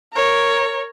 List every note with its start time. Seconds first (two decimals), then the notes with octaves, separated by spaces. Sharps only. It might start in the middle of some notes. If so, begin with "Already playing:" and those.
0.13 A#4 C#5